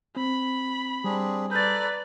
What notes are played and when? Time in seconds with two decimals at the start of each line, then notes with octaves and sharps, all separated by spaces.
0.16 C4 B5
1.04 G3 C4 D4 G#4
1.51 A4 B4 D5 A#5 G6 A6